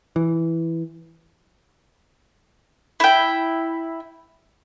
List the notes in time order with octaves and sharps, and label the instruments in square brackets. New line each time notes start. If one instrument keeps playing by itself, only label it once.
[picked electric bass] E3
[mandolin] E4 G5